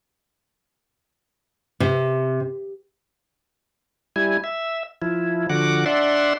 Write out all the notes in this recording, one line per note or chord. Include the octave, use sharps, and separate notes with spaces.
C3
G3 E4 G#5
E5
F3 E4
D3 F3 F#4 F#5 D6
D4 D5 E5 F#5 C6